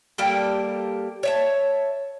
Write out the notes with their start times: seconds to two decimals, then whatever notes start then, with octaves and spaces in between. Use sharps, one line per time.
0.18 G3 A#3 G4 A4
1.23 C#5 E5 A5